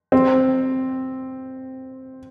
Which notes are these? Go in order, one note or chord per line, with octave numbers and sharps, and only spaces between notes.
C4